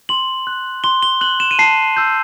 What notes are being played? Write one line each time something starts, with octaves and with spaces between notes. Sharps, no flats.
C6 F#7
F#6
C6 G7
G7
F#6 F#7
E7
D#7
A5 C7
E6 G6